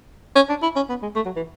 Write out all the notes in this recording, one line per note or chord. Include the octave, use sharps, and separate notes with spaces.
C#4
D4
E4
C#4
B3
G#3
A3
F#3
E3